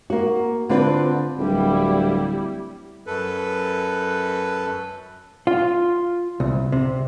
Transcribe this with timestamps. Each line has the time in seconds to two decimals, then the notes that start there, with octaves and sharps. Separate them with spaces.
0.10 A#3 F#4
0.69 D3 C4 D4 F4 B4
1.39 D1 G3 E4
3.06 F#2 A4 B4
5.47 F4
6.40 C2
6.72 C3